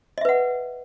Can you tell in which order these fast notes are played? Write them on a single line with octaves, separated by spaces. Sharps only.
D#5 E5 B4 F#5